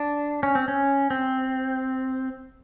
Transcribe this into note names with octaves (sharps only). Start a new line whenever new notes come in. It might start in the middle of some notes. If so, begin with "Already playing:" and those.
Already playing: D4
C#4
C4
C#4
C4